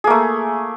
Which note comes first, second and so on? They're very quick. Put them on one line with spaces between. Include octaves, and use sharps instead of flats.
G#4 A#3 A3